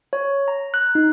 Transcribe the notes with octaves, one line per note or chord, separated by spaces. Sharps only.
C#5
A#5
F#6
D#4